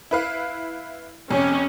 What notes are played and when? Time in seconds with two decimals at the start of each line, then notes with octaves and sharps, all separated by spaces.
0.11 E4 B4 F5
1.31 F2 C3 C#4